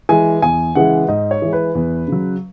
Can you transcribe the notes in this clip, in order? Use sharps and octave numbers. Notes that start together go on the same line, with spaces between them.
E3 G#3 G#5
E2 G#5
C#3 E3 G#3 F#5
G#2 D#5
C#5
E3 G#3
B4
E2
C#3 F#3